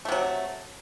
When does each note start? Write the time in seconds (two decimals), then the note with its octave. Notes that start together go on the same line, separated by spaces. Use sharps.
0.05 A3
0.08 C3
0.12 F#3